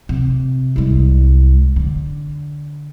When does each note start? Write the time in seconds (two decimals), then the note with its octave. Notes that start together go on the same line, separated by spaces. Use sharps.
0.09 C3
0.76 C2 G#3
1.76 D3